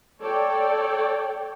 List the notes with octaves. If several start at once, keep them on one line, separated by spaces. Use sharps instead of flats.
A4 C#5 D5 G5